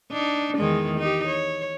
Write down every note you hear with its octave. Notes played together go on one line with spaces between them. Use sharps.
D4 D#4
E2 D#3 G#3
D#4 G4
C#5